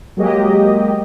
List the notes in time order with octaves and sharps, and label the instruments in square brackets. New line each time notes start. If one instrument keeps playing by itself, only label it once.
[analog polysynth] F#3 G#3 A#3 G4 D#5